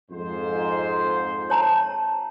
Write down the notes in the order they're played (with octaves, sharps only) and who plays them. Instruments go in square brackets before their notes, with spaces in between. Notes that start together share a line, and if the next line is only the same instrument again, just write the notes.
[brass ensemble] F2 G#2 C5
[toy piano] C#5 A5 A#5